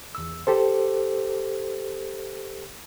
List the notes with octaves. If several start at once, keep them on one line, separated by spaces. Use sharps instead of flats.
E2 E6
G4 A4 C5